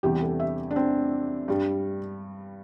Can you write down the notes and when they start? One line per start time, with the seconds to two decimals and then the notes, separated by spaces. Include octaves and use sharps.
0.03 E2 C3 E3 G3 G4
0.22 A4
0.40 E5
0.71 D4
0.76 C4
1.48 G2 G3